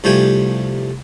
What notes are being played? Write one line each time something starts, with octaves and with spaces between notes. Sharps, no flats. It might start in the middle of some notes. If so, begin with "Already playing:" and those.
C2 F3 G3 A3 G5 G#5